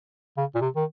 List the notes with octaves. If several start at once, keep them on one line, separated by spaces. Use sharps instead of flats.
C#3
A#2
C3
D#3